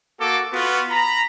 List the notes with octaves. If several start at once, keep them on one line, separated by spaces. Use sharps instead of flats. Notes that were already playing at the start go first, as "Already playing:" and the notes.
A#3 F#4 A4 D6
B3 F4 F#4
A#5 B5